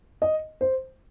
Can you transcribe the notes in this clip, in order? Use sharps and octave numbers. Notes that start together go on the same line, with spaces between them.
D#5
C5